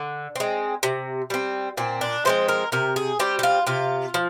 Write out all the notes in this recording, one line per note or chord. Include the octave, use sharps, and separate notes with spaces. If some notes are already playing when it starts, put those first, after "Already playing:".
Already playing: D3
G#3 C4
C3
G3 C4
A#2 C4
D4
F3 G#3 C4 C5
A#4
C3 A#4
G#4
G3 C4 G4
G4
F4
C3 F4
F3